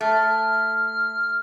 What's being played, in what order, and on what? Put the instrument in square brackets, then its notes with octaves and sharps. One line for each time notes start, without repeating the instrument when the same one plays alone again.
[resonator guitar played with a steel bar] A3 [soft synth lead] F6